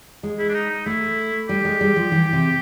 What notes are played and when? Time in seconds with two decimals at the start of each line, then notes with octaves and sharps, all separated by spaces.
0.23 G#3
0.39 E4
0.49 D4
0.54 D#4
0.70 D#4
0.86 A3 E4
1.49 G3 G4
1.65 G#3
1.81 G3
1.96 F3
2.12 E3
2.33 C3